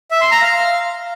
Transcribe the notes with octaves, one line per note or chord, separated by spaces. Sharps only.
E5
C6
A#5
F5